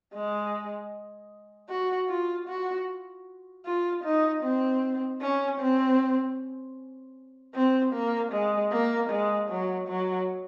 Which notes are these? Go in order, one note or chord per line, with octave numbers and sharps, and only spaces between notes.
G#3
F#4
F4
F#4
F4
D#4
C4
C#4
C4
C4
A#3
G#3
A#3
G#3
F#3
F#3